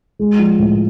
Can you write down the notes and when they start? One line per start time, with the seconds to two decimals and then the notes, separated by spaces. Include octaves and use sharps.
0.19 G#3
0.39 F3
0.59 A2